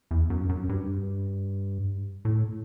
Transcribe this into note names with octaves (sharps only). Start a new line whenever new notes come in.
E2
F#2
F#2
G2
A2